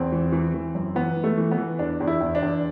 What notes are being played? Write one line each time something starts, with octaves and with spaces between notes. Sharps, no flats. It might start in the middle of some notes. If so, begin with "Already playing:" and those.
Already playing: E2 C4
E3
E3
E3
F#2
E3 B3
E3
A3
E3
B3
E3
E2 D4
E2
E4
E2
D4
E2